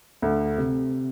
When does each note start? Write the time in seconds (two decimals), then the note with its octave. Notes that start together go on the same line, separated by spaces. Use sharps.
0.22 D2
0.58 C3